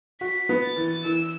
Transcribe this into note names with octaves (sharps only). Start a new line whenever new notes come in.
F#4 B6
B3
A6
E3
E3 E6